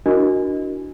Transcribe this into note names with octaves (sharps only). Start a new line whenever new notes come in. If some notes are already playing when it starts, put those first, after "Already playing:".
D4 E4 F#4 A#4 D#5